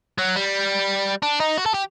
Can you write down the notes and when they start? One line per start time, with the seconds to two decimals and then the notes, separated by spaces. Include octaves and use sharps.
0.19 F#3
0.36 G3
1.23 D4
1.40 D#4
1.58 F#4
1.66 A4
1.74 G4